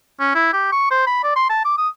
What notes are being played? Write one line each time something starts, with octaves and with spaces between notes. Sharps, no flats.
C#4
E4
G4
C#6
C5
B5
D5
C6
A5
D6
D#6